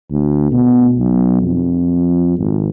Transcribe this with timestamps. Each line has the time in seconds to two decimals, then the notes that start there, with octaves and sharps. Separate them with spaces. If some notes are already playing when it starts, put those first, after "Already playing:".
0.11 D2
0.52 B2
0.99 B1
1.42 F2
2.39 G#1